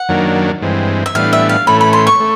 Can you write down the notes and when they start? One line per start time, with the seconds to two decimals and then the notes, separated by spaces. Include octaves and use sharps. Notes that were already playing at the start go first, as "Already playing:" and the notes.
Already playing: F#5
0.09 F#2 D#3 F#3 A#3 D4
0.62 G2 E3 G#3 C4
1.06 E5
1.15 A2 E3 G3 B3 D4 F5
1.33 E5
1.49 F5
1.67 A2 E3 A3 C#4 B5
1.81 B5
1.93 C6
2.07 C#6
2.20 A3